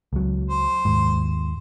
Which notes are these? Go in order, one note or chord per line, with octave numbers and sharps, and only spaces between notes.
C#2 F#3
C5
D#2 G#2